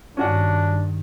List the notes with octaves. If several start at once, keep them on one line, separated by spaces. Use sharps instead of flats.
G2 D#3 C#4 D4 F#4 F#5